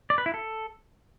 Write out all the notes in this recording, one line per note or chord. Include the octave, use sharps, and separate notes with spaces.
D5
B4
E4
A4